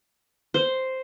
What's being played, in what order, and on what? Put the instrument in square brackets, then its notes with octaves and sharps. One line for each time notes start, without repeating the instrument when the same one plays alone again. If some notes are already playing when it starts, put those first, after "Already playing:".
[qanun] C5